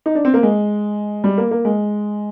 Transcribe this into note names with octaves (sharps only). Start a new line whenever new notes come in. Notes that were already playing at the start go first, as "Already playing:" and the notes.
D#4
D4
C4
A#3
G#3
G3
A#3
A#3
G#3